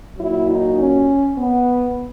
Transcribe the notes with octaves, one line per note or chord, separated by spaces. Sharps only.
A#2 F#3 E4
D#4
C#4
B3